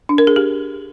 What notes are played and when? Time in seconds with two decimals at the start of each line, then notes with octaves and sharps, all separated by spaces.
0.09 D4
0.18 A#4
0.27 G#4
0.36 G4